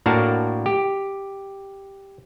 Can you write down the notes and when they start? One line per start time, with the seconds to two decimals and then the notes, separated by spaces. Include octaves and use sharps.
0.06 A2 A#3 D4 F#4 A#4 A5
0.66 G4